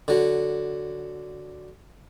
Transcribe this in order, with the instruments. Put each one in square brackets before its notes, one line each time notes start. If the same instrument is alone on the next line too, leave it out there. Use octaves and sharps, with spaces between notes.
[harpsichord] D3 F#3